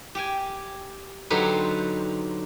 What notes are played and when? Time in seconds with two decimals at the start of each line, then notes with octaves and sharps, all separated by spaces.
0.15 G4 G5 G#5
1.30 D3 F#3 D#4 G4 B4 C5